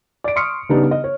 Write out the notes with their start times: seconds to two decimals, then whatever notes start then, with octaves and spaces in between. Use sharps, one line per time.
0.24 D5 D7
0.36 C6 C#6 D#6 F6 C#7
0.69 C#3 G3 B3 D4 D#4 G4
0.91 D#5
1.04 C#5